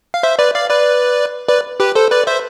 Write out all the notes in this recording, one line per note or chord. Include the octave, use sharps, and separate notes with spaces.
F5
C5 E5
B4 D5
D5 F5
B4 D5
B4 D5
G4 B4
A4 C5
B4 D5
C5 E5